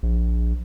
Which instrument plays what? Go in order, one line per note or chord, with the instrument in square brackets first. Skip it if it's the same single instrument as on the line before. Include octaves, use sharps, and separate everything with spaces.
[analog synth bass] A#1